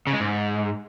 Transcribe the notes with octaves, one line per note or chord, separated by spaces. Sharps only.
C#3
G#3
G#2